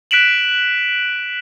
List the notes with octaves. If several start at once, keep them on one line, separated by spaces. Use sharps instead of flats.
F#6 B6 D7 E7 F#7